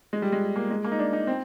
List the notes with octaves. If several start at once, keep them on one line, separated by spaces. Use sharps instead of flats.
G#3
G3
G#3
A#3
G#3
A#3
D#4
D4
D#4
C4